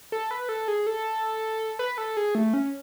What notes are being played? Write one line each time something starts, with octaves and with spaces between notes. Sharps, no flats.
A4
B4
A4
G#4
A4
B4
A4
G#4
A3
C#4